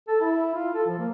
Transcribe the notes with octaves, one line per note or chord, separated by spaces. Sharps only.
A4
E4
F4
A4
F3
A#3